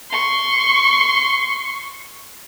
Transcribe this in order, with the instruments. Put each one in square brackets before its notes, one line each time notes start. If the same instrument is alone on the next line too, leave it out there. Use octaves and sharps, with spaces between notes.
[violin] C6 C#6